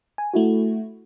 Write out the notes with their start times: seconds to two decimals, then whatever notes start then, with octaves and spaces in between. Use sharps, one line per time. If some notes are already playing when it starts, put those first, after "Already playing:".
0.18 G#5
0.34 A3 E4 F#4